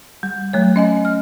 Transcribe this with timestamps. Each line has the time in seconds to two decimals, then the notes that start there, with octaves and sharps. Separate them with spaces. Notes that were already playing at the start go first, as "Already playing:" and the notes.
0.23 G3
0.53 F#3 A3 C#5
0.76 C#4 D#5 G#5
1.05 F6